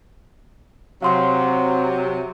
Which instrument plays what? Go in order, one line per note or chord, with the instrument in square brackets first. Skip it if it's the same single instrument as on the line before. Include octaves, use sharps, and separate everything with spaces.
[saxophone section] C3 F#3 [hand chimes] F5 C6 C#6